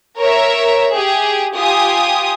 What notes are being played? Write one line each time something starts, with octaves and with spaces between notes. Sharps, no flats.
A#4 C#5 E5
G4 G#4
F4 G4 G#5 D#6